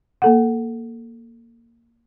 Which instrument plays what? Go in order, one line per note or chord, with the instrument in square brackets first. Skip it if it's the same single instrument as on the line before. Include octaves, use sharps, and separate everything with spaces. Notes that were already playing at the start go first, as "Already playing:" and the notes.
[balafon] A#3 A4 F#5